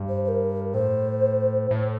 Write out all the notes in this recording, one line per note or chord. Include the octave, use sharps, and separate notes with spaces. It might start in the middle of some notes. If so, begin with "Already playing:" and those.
Already playing: G2
C5
C5
A#4
A2 C5
A2